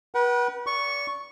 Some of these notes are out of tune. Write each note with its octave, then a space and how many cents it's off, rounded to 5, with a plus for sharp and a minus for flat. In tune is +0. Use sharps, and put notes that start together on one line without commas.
B4 -35 F#5 +35
D5 -30 C#6 +0